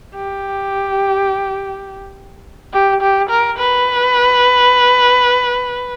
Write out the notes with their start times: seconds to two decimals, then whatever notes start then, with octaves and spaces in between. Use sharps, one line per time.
0.15 G4
2.73 G4
3.01 G4
3.30 A#4
3.58 B4